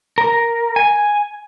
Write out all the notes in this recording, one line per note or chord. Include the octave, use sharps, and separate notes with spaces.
A#4
G#5